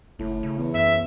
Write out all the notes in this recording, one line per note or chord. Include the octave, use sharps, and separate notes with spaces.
F#1 A2
C#3
E2
F#2 E5